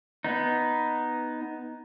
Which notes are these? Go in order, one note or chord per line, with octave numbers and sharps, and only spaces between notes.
B3 D#4